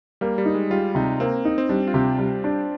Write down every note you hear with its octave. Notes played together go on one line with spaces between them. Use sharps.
G3 A#3
G3
D#4
G#3
G3 F4
C3 D#4
A#3 C4
D#4
C4
G3 D4
F4
C3 G4
G3
D4